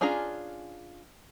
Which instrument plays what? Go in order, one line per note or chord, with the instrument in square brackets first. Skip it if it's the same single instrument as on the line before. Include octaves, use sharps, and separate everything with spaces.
[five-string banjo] C#4 D4 F4 G#4 A#5